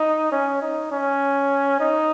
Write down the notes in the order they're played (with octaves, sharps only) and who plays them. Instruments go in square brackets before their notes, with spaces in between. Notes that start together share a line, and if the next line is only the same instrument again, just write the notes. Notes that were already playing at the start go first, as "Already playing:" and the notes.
Already playing: [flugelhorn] D#4
C#4
D#4
C#4
D#4